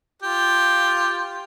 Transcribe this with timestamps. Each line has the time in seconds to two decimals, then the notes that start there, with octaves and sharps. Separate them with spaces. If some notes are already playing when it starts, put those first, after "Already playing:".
0.22 F4 G4